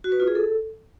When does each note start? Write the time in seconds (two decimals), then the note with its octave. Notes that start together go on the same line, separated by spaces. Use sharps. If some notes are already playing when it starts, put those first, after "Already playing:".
0.04 F#4
0.12 B4
0.20 F4
0.28 G#4
0.35 A4